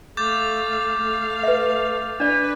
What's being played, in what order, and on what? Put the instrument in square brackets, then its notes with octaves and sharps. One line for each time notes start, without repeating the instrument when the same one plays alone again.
[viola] A3 F5 [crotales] D6 G6 A6
[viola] A3 F5
[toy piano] B4 E5
[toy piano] D4 D5 [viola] B4